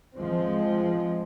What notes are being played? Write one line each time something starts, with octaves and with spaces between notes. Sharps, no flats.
F3 G#3 C4